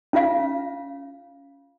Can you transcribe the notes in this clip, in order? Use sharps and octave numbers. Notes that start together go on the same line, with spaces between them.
C#4 F4 F5